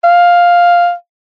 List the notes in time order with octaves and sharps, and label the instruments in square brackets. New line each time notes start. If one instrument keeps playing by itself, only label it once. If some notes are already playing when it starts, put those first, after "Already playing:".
[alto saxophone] F5